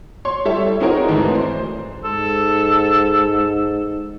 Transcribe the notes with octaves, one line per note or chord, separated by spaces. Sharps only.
C#5 C6
G3 A4 C#5 E5
C4 D#4 F#4 G#4 A#4 C#5
D2 G#2 E3 A3
C5
G#2 A4